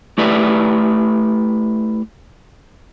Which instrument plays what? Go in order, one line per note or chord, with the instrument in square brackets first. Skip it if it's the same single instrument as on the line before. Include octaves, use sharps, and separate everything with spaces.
[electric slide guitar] A3 E4 G4 B4 D5 E5